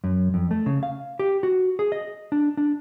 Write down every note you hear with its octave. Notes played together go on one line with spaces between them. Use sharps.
F#2
F2
A3
C#3
F5
G4
F#4
G#4
D#5
D4
D4